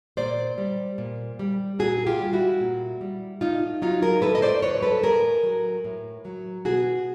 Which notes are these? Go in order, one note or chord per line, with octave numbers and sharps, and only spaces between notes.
A#2 C5 D5
G3
A#2
G3
A#2 F#4 G#4
F4 G4
G3
E4 F#4
A#2
G3
A2 D#4 F4
F#3 D#4 F4
G#4 A#4
A2 A4 B4
D#5
C5 D5
F#3 B4 C#5
A4 B4
A2 G#4 A#4
F#3
A2
F#3
B2 F#4 G#4